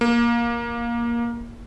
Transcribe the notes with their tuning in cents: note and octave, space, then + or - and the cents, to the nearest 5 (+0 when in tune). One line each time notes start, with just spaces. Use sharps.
A#3 +15